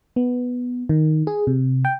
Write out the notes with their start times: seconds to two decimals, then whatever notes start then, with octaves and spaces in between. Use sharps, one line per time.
0.16 B3
0.89 D#3
1.27 G#4
1.47 C3
1.85 G5